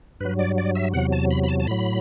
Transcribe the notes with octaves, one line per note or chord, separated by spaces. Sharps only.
G2 F#3 B4
D5
D5
E5
E2 C3 F#3 F#5
A5
B5
B5
A5
A5
A2 F#3 B5